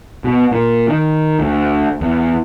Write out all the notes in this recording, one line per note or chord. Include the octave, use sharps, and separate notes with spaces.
B2
A#2
D#3
D2
E2